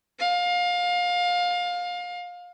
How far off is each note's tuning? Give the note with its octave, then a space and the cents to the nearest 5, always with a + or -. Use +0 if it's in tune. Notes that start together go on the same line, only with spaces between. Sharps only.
F5 +25